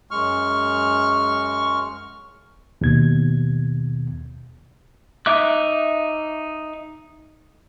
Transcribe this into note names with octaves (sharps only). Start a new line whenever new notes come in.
F#2 G#3 C#6 F6
D#2 B2 G#6
D#4 E5 D6 F#6